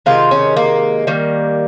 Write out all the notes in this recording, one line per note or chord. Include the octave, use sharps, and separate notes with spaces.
C3 D#3 G#3 F4
C#4
A#3
D#3 G3 A#3